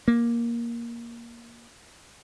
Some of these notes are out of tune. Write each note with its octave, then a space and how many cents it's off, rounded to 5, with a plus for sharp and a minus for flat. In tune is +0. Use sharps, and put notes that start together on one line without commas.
A#3 +10